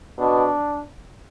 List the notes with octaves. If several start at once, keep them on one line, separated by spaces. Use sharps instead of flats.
B2 D4